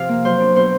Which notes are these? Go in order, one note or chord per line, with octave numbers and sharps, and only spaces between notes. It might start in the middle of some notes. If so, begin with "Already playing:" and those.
Already playing: C3 F3 F5
A#3
F#3 C5
D4
B2 C5